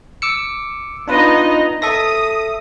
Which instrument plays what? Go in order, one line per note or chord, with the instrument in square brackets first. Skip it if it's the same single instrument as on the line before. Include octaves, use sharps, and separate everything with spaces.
[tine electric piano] D6 E6 C#7
[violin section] B3 D#4 D#5 [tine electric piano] D4 F4 B4
[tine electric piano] A4 E5 A#6 [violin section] D#6